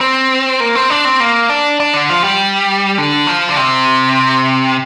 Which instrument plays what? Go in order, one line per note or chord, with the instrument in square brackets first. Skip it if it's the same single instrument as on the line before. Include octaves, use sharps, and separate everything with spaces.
[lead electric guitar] C4
A#3
C4
D4
C4
A#3
D4
D4
D3
F3
G3
D3
F3
D3
C3